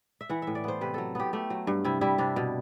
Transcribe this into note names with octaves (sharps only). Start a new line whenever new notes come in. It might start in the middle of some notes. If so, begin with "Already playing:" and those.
E5
E3 F#5
A2 E5
D5
B3 C5
C3 B4
F#3 A4
B3 G4
A3 G4
F#3
G2
C3 E4
G3 E4
C3 D4
B2